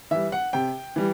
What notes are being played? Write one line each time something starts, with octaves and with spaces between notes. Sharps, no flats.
E3 G3 E5
F#5
C3 G5
E3 G3